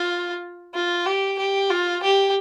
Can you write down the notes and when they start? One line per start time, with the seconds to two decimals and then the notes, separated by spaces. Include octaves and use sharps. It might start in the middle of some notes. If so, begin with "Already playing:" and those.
Already playing: F4
0.74 F4
1.06 G4
1.38 G4
1.70 F4
2.03 G4